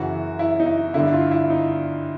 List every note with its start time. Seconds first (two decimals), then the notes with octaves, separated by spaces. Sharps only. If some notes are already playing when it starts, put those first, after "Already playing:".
Already playing: F#2 C#3 E3 F#4
0.39 E4
0.60 D#4
0.66 E4
0.94 G2 D3 E4
1.13 F4
1.31 E4
1.50 D#4